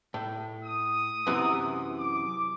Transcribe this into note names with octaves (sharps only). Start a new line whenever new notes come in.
A2
D#6
F#2 C3 E3
D6